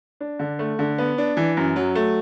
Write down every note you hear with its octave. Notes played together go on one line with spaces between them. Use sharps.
D4
D3
A3
D3
B3
D4
E3
F#2
F#3
A3